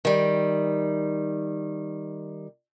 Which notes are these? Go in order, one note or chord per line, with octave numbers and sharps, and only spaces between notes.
D#3 G3